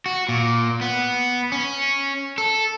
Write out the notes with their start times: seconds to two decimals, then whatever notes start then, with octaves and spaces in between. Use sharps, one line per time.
0.06 F#4
0.29 A#2
0.81 B3
1.52 C#4
2.38 A4